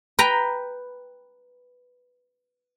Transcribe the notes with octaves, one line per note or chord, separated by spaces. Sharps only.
B4 G5 A#5